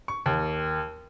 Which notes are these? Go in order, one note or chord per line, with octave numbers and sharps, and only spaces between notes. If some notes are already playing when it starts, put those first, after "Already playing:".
C#6
D#2